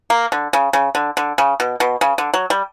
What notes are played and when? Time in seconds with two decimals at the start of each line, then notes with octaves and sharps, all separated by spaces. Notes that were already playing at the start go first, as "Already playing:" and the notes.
0.10 A#3
0.32 D3
0.53 C#3
0.73 C#3
0.95 D3
1.17 D3
1.38 C#3
1.60 B2
1.80 B2
2.01 C#3
2.18 D3
2.34 F#3
2.50 G3